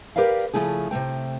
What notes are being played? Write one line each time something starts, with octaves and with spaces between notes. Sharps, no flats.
G4 A#4 B4 D5 F5
C#3 F3 A3 E4 G#4
C3 F3 A3 G5